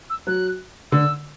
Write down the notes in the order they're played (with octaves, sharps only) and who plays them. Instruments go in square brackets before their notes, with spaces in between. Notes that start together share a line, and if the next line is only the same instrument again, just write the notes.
[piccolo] E6
[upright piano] F#3 [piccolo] F#6
[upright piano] D3 [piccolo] E6